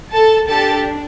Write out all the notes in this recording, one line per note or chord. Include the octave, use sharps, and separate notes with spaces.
A4 A5
D4 G4 A4 A5